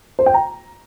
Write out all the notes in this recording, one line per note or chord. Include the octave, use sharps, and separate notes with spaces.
C5
G5
A#5